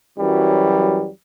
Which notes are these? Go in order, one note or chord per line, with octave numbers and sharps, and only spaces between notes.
F#2 E3 F#3 G3